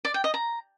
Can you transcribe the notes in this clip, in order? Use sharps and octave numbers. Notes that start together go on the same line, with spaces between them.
D5
G5
D#5
A#5